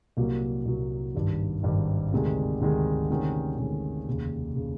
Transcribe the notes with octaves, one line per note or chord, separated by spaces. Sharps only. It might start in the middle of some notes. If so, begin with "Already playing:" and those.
C2 A#2 F#3 A#3
C2 A#2 F#3 A#3
G#1 G2 D#3
G#1 G2 D#3
D2 C3 D#3 G#3
D2 C3 D#3 G#3
D2 C3 D#3 G#3 C#4
D2 C3 D#3 G#3 C#4
F1 D#2 C#3
C#3